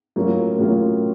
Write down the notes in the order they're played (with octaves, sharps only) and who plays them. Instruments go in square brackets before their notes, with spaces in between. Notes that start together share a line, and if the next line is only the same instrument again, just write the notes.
[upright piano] A2 F#3 A#3 C#4 F4
A2 F#3 A#3 C#4 F4